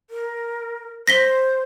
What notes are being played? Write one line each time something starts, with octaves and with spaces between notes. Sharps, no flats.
A#4
C5 A#6 B6 G7